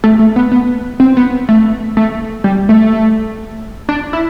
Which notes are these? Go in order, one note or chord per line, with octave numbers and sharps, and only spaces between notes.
A3
A3
B3
B3
C4
B3
A3
A3
G3
A3
D4
E4